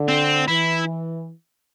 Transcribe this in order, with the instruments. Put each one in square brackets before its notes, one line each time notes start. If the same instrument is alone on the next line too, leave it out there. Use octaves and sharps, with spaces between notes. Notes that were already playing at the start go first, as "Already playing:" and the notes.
Already playing: [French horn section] D3
[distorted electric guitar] C4
[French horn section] E3 [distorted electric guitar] E4